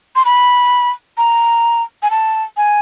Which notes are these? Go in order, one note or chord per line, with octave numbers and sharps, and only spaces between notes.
C6
B5
A#5
G#5
A5
G#5